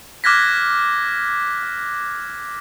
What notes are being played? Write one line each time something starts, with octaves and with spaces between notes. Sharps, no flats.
D6 F6 F#6 G#6 A#6 B6